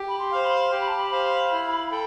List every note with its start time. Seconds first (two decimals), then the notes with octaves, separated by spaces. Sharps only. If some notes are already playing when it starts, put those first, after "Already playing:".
Already playing: G4
0.08 B5
0.18 C6
0.32 C5 F5
0.45 B5
0.71 G4 C6
0.80 B5
0.88 A5
0.97 B5
1.12 C5 F5
1.52 E4
1.91 A4 G5